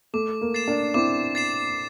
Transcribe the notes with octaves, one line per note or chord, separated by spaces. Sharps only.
A3 D6
A#3
A6 C7 E7
A#3 D4
C4 E4 D6
A6 C7 E7